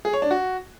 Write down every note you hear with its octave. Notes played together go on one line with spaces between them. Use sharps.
G#4
C#5
D4
F#4